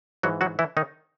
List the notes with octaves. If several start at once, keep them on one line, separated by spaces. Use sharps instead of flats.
G#2 E3 F#3 F#4
F#3 F#4
E3 E4
D#3 D#4